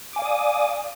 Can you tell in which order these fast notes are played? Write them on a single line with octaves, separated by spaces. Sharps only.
D6 G#5 F5 D5 D#6